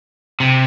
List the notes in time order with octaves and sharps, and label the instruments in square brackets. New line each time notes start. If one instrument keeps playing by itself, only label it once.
[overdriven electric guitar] C3